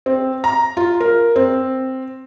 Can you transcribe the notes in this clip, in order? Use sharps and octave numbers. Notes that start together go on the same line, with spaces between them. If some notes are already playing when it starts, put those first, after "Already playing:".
C4
A#5
F4
A#4
C4